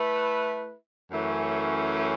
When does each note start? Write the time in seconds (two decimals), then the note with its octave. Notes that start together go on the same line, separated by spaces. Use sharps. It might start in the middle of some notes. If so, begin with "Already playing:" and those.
Already playing: A3 E4 B4 E5
1.12 F#2 E3 A3 C#4